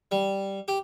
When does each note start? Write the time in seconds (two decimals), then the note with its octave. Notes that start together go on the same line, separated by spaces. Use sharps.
0.11 G3
0.68 G4